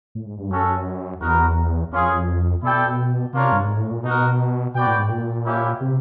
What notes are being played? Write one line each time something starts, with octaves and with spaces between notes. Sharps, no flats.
A2
G#2
G2
F#2 C#4 F#4 A4
E2 B3 D#4 F#4 A#4
F2 A#3 C#4 F4 G#4
B2 E4 A4 D5 G5
C3 A#3 D4 F4 A#4 C#5
G2
G#2
A2
A#2
B2 D#4 F#4 A#4
B2 F#4 B4 D5 G5
A2
G#2
A#2
A#3 C#4 E4 G4
C3